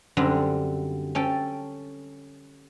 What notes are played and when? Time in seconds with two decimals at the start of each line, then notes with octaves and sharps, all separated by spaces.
0.17 F#2 D3 G3 C4
1.15 C#4 A4 G5